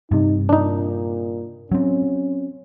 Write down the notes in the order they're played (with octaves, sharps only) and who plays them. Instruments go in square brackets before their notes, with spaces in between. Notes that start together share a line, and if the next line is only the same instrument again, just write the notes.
[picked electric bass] G2 C3 [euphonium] D#4
[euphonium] A#2 [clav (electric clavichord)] D4 D#4
[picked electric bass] F#3 C4 [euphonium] C#4